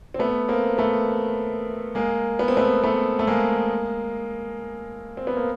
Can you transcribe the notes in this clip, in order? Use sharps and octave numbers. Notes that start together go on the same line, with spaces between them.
C4
A3 B3
A#3 C4
A3 B3
G#3 A#3
B3
C4
A3 B3
A3 B3
A3
G#3 A#3
C4
B3
A#3